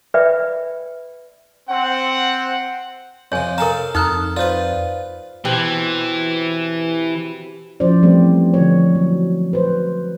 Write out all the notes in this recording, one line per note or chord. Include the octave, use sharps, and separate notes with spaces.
B4 D5 E5 G5 B5
C4 F#5
F2 C3 C#5 G#5
A4 A#4 F5 G#5 A#5
F2 D#4 A4 A#5 D#6 F6 F#6
F4 B4 C5 D5
B2 E3 C4 G4
F3 C#4 E4 C5 D5
E3 G3 A3 C4 E4
E4
D3 E3 F3 C#5
F#3
B4 C5